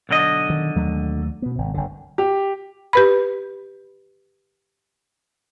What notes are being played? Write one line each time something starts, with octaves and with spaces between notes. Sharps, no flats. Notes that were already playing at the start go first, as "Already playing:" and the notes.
B1 D3 D#5
D#3
D#2 F#3 A3
B2 B3
G#1 C3
F#1 D3
G4
G4 B4 B5